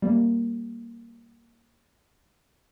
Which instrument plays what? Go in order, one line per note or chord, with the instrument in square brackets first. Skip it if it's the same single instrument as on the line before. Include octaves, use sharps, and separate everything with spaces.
[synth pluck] G3 A#3